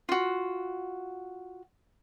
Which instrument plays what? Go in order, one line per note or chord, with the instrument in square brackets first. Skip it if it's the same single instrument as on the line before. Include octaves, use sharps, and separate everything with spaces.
[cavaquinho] F4 F#4